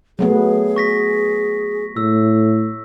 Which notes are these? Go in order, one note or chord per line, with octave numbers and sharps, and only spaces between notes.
F#3 A3 B3 G#4
C#6 A#6 B6
A2 E6